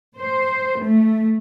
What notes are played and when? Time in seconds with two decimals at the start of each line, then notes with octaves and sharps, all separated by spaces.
0.17 C5
0.80 A3